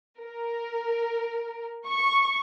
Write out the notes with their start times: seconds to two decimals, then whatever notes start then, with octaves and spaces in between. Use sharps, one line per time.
0.19 A#4
1.87 C#6